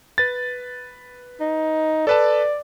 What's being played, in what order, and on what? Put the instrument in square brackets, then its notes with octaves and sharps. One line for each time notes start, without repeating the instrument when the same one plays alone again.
[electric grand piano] B4 A6
[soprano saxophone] D#4
[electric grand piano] A4 B4 A5 [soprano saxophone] D5